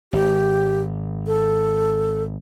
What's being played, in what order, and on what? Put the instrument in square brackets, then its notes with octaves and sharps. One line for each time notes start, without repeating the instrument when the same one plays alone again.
[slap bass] G#1 [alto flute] G4
[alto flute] A4